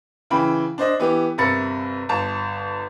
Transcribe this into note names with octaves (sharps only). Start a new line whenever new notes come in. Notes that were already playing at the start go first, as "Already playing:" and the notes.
C#3 E3 G5 B5
D4 C5 D#5
E3 B3 G4
G1 C3 A#4 B5 A6 C#7
G1 A5